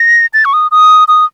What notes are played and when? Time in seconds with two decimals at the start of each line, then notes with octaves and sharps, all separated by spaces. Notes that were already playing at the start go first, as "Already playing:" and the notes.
Already playing: A#6
0.34 A6
0.45 C#6
0.53 D#6
0.71 D#6
1.08 D#6